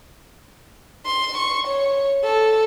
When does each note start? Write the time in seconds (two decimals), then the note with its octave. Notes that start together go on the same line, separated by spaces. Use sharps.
1.06 C6
1.37 C#6
1.67 C#5
2.24 A4